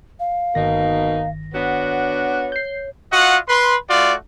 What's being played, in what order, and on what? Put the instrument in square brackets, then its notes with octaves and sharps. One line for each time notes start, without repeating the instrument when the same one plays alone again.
[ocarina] F5
[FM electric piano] G1 D#3 A#6 [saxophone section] B2 A#3 D#4
[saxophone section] B3 D4 F#4 [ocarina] C#5
[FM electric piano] G6 C7
[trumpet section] F4 F#4 D#5 F#5
B4 C6
A3 F4 F#4 D5